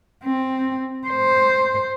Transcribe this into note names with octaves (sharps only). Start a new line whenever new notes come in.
C4
C5